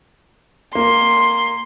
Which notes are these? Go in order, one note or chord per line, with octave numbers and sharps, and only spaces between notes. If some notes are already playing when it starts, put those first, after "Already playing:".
A#3 C6